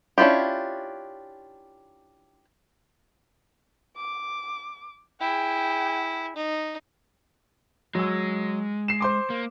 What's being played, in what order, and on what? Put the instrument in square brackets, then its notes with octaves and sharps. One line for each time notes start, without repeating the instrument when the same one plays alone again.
[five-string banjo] C#4 D4 E4 F4 G4
[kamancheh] D6
[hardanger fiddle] E4 [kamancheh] G#4 G5
[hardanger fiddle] D#4
[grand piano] F#3 E6 [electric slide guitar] G#3
[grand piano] C7 E7
C5 C6 D6
[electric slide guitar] A#3